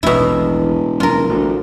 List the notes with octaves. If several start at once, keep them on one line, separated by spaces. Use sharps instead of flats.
E1 A1 D#2 B2 E4
F1 F#3 C#4 F4 A#4
A1 D2 A3